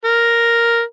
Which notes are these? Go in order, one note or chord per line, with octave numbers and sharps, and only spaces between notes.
A#4